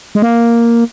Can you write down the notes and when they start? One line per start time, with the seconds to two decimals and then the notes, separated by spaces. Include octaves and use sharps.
0.15 G#3
0.22 A#3